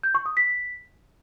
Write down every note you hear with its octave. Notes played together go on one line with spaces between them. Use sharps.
G6
C#6
D#6
B6